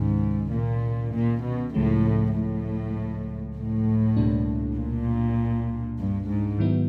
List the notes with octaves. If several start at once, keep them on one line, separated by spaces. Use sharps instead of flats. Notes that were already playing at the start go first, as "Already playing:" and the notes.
Already playing: C#2 G#2 C3 D#3 G#3 C#4
A#2
A#2
B2
C#2 A2 C#3 F3 G#3
A2
A2
C#2 B2 G3 A#3 D4
A#2
G2
G#2
G#2 D#3 F#3 B3 E4